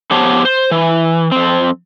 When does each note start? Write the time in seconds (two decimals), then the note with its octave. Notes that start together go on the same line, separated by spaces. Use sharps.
0.11 F3 B3 G4 C5 C#5 A5
0.45 C5
0.71 E3
1.32 F2 C4